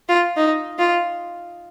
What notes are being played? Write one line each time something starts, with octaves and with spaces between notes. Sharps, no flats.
F4
D#4
F4